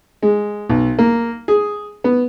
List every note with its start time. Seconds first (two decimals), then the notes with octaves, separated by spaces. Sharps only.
0.22 G#3
0.69 B1
0.99 A#3
1.48 G#4
2.04 B3